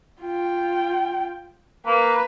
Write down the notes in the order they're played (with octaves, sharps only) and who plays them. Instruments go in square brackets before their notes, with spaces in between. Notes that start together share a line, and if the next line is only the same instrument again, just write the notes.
[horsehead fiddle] F4 G5
[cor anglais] A#3 [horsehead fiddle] B4